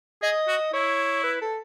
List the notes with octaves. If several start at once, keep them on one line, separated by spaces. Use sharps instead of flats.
G#4 D#5
F#4
E4 C#5
B4
A4